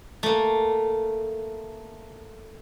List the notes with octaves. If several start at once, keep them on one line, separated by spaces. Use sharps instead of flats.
A3 A#3